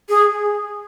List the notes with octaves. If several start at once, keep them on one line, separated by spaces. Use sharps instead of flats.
G#4